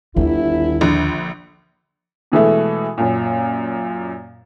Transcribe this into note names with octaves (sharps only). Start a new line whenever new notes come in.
G1 D#2 E4
A#1 D3
B2 E3 G#3 A3
F#2 A#2